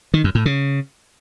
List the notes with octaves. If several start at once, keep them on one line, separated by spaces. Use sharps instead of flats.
D#3
F#2
A2
C#3